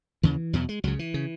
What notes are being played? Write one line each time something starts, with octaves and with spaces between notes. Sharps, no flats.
D#2 C#3 E3
E2 B2 F#3
G#3
C#2 C#3 F#3
E3
C#3